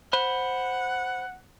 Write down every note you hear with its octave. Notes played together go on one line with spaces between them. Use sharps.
C5 F#5 B5